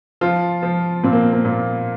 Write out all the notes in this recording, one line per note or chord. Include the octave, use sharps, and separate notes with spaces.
F3 F4
F3
A#2 C4
A#3
A#3
A#2